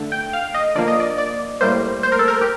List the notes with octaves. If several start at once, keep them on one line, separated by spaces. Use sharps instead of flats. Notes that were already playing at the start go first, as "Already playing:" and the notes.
Already playing: D3 A3
G5
F5
D#5
D3 F3 A#3 D5
D#5
D5
D5
A2 G3 A#3 C5
C5
A#4
A4
A#4
G4